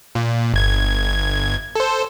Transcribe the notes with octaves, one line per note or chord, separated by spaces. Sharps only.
A#2
G1 G#6
A4 C5